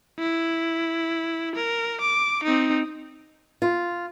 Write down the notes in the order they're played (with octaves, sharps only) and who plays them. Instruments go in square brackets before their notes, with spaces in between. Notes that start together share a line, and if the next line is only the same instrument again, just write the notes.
[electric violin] E4
A#4
D6
C4 D#4
[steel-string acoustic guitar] F4